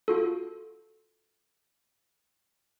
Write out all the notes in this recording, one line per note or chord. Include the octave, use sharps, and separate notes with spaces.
F4 F#4 A4